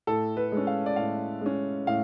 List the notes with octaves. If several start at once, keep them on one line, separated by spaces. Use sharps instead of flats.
A2 A4
B4
G#3 C#4
F5
D5
A2 F5
G#3 C#4
A2 F5